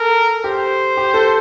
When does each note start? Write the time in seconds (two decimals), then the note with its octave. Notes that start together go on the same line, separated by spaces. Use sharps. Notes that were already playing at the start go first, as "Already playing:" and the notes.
Already playing: A4 A#4
0.44 G4 C5
0.97 G4
1.14 A4